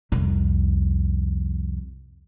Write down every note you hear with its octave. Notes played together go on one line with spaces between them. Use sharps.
C2 F2